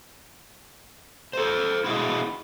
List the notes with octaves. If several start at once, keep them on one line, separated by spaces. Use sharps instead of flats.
A4 C5
E4 F#4 G#4 D#5